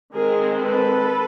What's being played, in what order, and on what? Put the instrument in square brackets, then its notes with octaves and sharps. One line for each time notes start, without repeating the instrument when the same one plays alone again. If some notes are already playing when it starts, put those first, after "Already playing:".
[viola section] D#3 G#3 C4 G#4 A#4
A4 B4